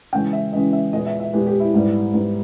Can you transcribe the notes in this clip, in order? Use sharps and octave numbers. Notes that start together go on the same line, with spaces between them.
C#3 E3 G#3 C#4 G5
E5
C#3 E3 G#3 C#4 D#5
E5
A#2 G#3 B3 D#5
E5
E5
A#2 G#3 B3 G4
G4
E4
G#2 G3 B3
G#2 G3 B3